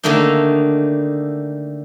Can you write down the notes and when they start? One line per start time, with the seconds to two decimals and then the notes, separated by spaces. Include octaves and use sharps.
0.03 D3 D#3 A3 A#3 D#4